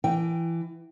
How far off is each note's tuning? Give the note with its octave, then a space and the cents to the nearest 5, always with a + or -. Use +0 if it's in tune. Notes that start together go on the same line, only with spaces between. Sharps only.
E3 +20 G5 +0